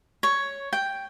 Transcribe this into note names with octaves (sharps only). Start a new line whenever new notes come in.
C#5
G5